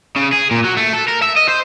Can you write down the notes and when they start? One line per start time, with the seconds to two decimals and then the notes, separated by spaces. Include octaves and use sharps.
0.16 C#3
0.32 G#4
0.51 A#2
0.65 F#3
0.77 A3
0.94 A4
1.09 A#4
1.22 E5
1.36 D#5
1.48 C5